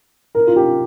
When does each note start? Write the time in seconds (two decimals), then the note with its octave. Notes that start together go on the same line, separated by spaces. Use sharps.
0.35 A#4
0.47 F4
0.56 G4